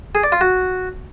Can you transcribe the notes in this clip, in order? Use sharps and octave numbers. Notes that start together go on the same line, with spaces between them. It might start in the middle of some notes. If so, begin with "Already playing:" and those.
G#4
D5
F4
F#4